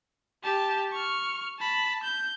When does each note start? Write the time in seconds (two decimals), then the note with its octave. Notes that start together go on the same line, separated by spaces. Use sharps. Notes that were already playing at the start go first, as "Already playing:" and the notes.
0.44 G4 A5
0.92 C#6 F6
1.59 A5 B5
2.03 G6